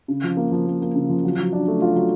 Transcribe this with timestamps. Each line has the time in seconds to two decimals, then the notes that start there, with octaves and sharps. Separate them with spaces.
0.08 C#3
0.23 F3
0.37 A#3
0.52 F3
0.67 A#3
0.81 A#3
0.95 C#3
1.10 F3
1.23 F#3
1.38 F#3
1.53 D4
1.68 A3
1.82 F4
1.96 F#3